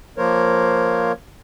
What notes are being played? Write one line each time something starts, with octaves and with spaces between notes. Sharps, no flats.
F3 A#3 A#4 C5 C#5